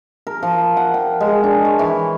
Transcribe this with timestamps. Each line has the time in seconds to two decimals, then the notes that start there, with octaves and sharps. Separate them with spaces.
0.27 A#4
0.43 F3
0.77 F#5
0.94 G5
1.20 G#3
1.44 D4
1.65 C#5
1.79 E3